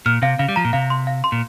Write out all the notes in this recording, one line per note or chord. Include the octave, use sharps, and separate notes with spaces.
A#2 F6
C3 F5
C#3 F5
G3
F3 A#5
A#2
C3 F5
C6
F5
C6
A#2